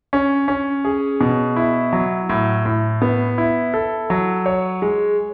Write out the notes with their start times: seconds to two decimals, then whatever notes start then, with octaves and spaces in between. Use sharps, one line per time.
0.13 C#4
0.48 C#4
0.85 G#4
1.21 B2
1.56 E4
1.93 F#3
2.29 A2
2.66 A2
3.02 B3
3.38 E4
3.74 A4
4.10 F#3
4.46 C#5
4.82 G#3